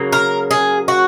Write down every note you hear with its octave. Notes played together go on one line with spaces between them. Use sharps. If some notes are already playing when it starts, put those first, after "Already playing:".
Already playing: C#3 F#3 A#3
A#4
G#4
F#4